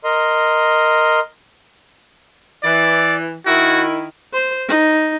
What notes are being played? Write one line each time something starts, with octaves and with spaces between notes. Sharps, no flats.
A#4 D#5 C6
E3 D5
D#3 E4 F#4
C5
D#4